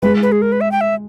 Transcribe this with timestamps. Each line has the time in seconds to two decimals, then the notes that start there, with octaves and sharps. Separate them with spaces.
0.02 G#3 B4
0.23 B4
0.32 G#4
0.42 A#4
0.52 B4
0.61 E5
0.72 G5
0.81 E5